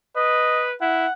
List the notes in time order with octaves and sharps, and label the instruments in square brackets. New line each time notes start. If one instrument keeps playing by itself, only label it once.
[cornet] B4 [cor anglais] D#5
[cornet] E4 [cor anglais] F#5